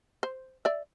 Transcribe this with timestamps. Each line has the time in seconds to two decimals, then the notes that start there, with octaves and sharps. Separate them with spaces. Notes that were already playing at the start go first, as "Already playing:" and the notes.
0.23 C5
0.65 D5 E5